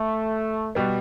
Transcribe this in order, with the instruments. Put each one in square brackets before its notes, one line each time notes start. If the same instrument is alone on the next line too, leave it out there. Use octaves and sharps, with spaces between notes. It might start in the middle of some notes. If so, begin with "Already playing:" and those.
Already playing: [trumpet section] A3
[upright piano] B2 G3 B3